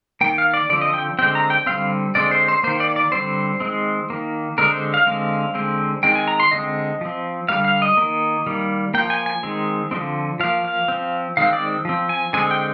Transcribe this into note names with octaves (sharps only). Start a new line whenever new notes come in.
D#3 A#3 G5
F5
D5
D3 F3 C4 D5
D#5
G5
D3 G#3 C4 G5
A#5
G5
D3 G3 C4 F5
D3 G#3 C4 D5
C5
C5
D#3 A#3 C5
D5
D5
D3 G3 C4 C5
D#3 G#3 C4
D#3 A#3
D3 G#3 C4 A#4
C5
F5
D3 G#3 C4
D3 G#3 C4
D#3 G#3 C4 G5
G#5
A#5
C6
D3 G#3 C4 D#5
F3 C4
D3 G3 A#3 F5
F5
D#5
D#3 G3 A#3
D#3 G3 A#3
F3 A#3 G5
G#5
G#5
D#3 G#3 C4
D3 F3 G#3 C4
F3 A#3 F5
F5
F3 C4
D#3 G#3 C4 F5
D5
F3 C4
G#5
D3 G#3 C4 G#5
G5